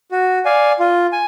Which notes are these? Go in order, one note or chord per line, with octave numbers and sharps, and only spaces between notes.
F#4
D5 F5 G#5
F4
G#5